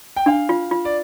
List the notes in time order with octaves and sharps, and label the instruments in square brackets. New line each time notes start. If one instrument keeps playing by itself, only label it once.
[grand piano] G5
[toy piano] D4 [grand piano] F5
[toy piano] F4
F4
[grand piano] D5